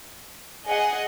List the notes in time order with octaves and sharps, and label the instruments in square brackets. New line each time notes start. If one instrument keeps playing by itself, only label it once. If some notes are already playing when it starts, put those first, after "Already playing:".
[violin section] G#4 D#5 F#5